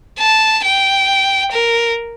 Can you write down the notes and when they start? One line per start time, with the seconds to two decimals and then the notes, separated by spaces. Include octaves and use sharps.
0.19 A5
0.64 G5
1.52 A#4